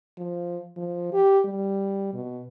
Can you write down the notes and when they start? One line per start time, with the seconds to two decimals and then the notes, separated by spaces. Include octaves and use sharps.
0.18 F3
0.77 F3
1.13 G4
1.45 G3
2.14 B2